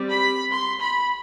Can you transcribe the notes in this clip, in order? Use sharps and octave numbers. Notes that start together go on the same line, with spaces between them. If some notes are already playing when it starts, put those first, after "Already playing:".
Already playing: G3 C4
B5
C6
B5